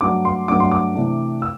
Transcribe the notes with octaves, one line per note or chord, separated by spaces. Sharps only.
G2 F#3 A3 D4 D6
C6
G2 F#3 A3 D4 D6
C6
D6
C3 E3 A3 D4
E6